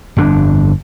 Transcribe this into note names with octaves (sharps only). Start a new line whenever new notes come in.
G1 F2 D4